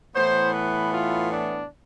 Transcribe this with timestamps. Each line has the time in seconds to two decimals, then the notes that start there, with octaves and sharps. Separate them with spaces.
0.15 A2 E3 B3 C5
0.54 B4
0.93 F4
1.32 D4